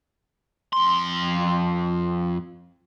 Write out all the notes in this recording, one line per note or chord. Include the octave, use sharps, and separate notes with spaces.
F2 C6